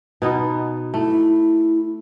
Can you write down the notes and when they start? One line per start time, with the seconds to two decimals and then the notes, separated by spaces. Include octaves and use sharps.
0.22 B2 B3 D#4
0.94 A3 E4